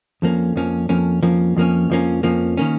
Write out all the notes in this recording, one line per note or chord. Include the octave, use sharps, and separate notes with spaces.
F2 F3 A#3 C#4
F2 F3 A#3 C#4
F2 F3 A#3 C#4
F2 F3 A#3 C#4
F2 F3 A#3 C#4
F2 F3 A#3 C#4
F2 F3 A#3 C#4
D#3 A#3 C#4